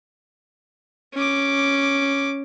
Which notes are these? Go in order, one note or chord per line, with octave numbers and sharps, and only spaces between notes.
C#4 D6